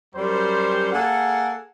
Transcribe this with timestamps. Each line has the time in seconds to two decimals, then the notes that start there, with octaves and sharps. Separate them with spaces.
0.14 F#2 G3 C5
0.92 A#3 G#4 A4 F#5